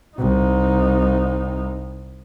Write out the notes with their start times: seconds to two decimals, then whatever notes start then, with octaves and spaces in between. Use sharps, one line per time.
0.17 C2 D#4